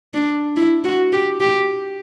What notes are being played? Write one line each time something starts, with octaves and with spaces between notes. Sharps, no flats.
D4
E4
F#4
G4
G4